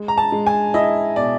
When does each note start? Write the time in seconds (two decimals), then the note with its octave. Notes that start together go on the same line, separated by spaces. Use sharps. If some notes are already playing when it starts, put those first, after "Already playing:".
Already playing: G#3
0.08 A#5
0.17 A5
0.32 G#3
0.46 G#5
0.74 E4 D#5
1.16 B2 D5